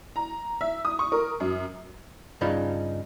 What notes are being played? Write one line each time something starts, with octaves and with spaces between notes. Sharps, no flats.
A#5
E5
D#6
C#6
A#4
F#2
G2 C#3 D#4 F4 B5